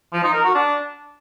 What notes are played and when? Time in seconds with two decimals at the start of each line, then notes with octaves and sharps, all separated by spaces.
0.13 F3
0.23 D#4
0.34 A#4
0.44 F#4
0.55 D4